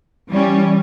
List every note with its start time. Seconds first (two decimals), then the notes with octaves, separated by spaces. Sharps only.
0.31 E3 G3 C#4